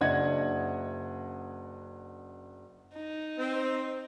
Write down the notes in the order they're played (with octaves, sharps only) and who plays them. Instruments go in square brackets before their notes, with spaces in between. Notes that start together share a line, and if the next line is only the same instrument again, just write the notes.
[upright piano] F#1 D4 D#5 F#5 G#6
[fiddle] D#4
[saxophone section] C4